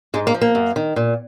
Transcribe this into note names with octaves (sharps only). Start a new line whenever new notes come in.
G#2 G#3
A#3
F3
A#3
F#2
D#3
A#2